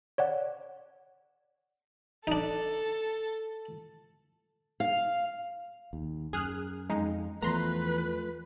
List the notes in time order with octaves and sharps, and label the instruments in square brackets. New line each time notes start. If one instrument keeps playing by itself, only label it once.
[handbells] C#5 D5 F#5
[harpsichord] D4 D#4 [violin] A4
[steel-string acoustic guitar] F5
[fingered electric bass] D#2
[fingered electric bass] F#2 [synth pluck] G#4 F6 F#6
[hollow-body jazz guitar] F2 [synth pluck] G#3 D#4
[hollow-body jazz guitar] E2 [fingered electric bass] F3 A3 [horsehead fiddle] B4 [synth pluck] A#5 C6